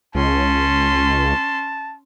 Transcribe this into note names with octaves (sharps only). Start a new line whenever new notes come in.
C#2 C#4 A5 C6